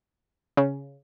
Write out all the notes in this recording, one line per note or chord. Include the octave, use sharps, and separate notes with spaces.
C#3